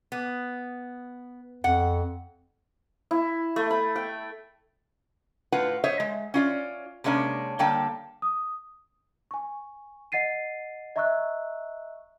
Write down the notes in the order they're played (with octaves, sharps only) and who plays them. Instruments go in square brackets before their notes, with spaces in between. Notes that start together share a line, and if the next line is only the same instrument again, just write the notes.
[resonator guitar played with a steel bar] B3
[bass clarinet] F2 [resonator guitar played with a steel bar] F#5
[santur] E4
A3
B5
G5
[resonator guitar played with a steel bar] A2 F4 B4 F#5
C5 C#5 D#5 E5
G#3
C#4 F4 D5
C3 G#3 A#3 C#4 D4
D3 G3 A#3 G5 A5
[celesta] D#6
G#5 C#6
D#5 F#5 A6 C7 D#7
D#5 E5 A#5 C#6 E6 F#6